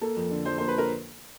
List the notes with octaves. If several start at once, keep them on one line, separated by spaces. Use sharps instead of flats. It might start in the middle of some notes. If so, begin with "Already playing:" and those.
A#3 A4
F2
D3
F3 C5
A#3 C5
B4
A#4